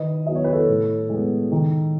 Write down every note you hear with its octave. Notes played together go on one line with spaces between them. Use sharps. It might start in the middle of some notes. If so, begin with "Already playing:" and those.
Already playing: D#3 B4 D#5
F#3 B3 D#5
C#5
B4
A4 C#5
A2
G#3 B3
D#3